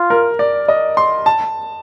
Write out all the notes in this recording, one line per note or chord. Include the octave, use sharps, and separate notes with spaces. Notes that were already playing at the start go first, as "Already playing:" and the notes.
Already playing: F4
A#4
D5
D#5
C6
A5